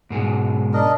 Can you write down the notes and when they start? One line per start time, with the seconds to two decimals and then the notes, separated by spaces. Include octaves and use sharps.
0.10 G#2 B2 G#3
0.74 D4 A#4 D#5